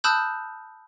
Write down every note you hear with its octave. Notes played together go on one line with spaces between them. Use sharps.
A5 B5 D#6 E6 F#6 G6